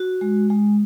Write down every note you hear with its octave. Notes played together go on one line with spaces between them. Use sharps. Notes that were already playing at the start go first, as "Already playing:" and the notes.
Already playing: F#4
G#3
G#3